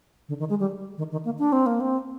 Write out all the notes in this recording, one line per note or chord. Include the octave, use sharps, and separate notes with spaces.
D3
D#3
G#3
G3
D#3
D#3
A#3
D4
C4
A#3
C4